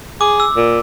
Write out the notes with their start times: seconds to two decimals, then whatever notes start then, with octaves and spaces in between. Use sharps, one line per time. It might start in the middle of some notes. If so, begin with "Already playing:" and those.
0.21 G#4 D6
0.40 E6
0.56 A#2